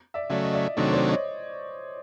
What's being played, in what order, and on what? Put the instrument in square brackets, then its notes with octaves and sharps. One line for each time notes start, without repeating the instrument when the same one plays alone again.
[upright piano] D5 E5
[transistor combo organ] C#3 F#3 A3 [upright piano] D5 E5
[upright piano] D#5
D5 E5
[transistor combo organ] C3 D#3 F#3 A3 D4 [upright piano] C#5 D#5
[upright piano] C#5
C5 D5
C#5 D#5